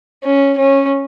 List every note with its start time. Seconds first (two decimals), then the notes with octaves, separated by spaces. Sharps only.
0.24 C#4
0.57 C#4